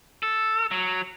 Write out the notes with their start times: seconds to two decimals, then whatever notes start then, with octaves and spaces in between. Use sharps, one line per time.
0.23 A4
0.71 F#3